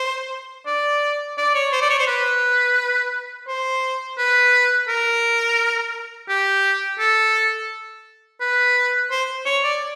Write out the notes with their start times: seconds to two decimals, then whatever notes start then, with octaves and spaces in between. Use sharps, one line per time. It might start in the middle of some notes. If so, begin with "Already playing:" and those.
Already playing: C5
0.66 D5
1.38 D5
1.55 C#5
1.72 C5
1.82 D5
1.90 C#5
1.99 C5
2.07 B4
3.48 C5
4.18 B4
4.89 A#4
6.29 G4
6.99 A4
8.41 B4
9.11 C5
9.45 C#5
9.64 D5